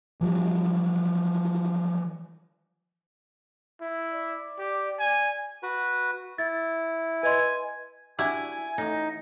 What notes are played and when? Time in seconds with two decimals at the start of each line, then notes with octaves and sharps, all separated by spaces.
0.21 E3 F3 G3
3.81 E4
4.13 D5
4.59 G4
4.99 G#5
5.63 F#4 B4
6.38 E4 A6
7.23 B4 D#5 G#5 C6
8.19 D4 E4 F#4 G4 G#5
8.78 A1 A2 D#4